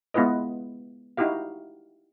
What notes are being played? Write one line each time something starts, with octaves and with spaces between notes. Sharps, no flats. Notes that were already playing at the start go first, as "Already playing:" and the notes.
G#3 B3 E4 F4 B4 D#5
D#4 E4 F#4 G4 F5